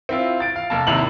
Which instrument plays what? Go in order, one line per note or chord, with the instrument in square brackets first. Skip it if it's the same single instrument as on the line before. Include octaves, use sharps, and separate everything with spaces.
[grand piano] C4 E4 F4
A6 D7
F5
F1 A#3 A5
G#1 C3 E4 F7 F#7